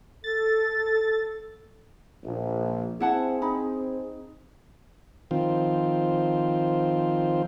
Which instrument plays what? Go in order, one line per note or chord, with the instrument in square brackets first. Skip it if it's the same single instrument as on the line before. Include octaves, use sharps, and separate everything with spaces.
[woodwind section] A4 [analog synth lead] A6
[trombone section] A#1
[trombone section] C4 G#4 [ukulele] E4 F#5 A5
[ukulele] D#4 B5
[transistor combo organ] D#3 F3 C4 F4